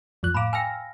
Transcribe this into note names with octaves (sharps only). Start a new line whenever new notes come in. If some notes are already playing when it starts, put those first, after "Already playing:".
F2 F3 F#6
A2 F5 A#5 B5 D6
G5 G#5 E6 F6 A#6